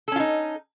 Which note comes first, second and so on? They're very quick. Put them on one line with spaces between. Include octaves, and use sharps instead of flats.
A4 C#4 F4 D#4